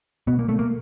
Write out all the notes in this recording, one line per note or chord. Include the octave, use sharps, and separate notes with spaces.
B2 B3
A#3
A3
A#3